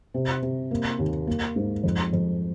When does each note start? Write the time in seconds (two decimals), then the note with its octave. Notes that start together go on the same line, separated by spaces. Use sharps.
0.14 C3
0.42 C3
0.71 A#3
0.99 D#2
1.27 A#3
1.56 G#2
1.83 F2
2.13 F2